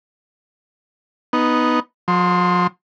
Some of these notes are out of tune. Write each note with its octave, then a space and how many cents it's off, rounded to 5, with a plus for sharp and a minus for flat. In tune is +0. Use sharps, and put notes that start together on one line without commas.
B3 +0 D#4 +0
F3 +45 C6 +0